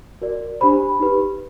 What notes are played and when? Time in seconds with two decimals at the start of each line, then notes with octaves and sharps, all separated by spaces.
0.22 F#4 A#4 D5
0.60 D4 G4 C5 B5
1.00 D#4 G4 B4